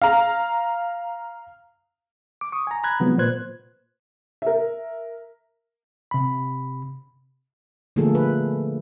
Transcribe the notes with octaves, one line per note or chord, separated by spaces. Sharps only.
F5 A#5
D6
C#6 D#6
G#5 A#5
A#5 B5 F#6 G#6
C3 D#3 F3 F#3 G#3 B3
A#2 B4 C5 F#6 G#6
A#4 E5
C3 B5
D3 F3 A3 A#3 G#4 A4
B4